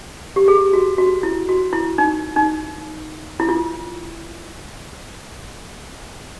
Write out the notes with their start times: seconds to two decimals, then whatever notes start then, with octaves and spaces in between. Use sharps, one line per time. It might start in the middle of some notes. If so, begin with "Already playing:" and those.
0.36 G4
0.48 G#4
0.73 F#4
0.98 F#4
1.23 E4
1.49 F#4
1.73 E4
1.98 D#4
2.36 D#4
3.40 E4
3.49 F4